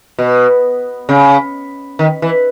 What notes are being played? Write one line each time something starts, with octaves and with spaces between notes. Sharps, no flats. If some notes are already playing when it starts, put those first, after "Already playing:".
B2
C#3
D#3
E3